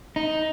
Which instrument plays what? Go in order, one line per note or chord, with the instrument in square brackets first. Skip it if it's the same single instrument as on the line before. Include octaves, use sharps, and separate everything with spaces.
[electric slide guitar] D#4